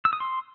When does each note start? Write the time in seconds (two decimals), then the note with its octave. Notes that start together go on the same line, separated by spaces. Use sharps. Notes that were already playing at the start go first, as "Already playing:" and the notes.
0.05 E6
0.13 D#6
0.20 C6